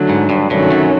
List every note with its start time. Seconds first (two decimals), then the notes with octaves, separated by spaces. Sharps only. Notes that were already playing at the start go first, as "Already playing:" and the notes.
Already playing: D3 F#3 A3 D4
0.09 G#2
0.30 G2
0.50 G2 C3 D#3 F#3 A3 C#4
0.71 F#2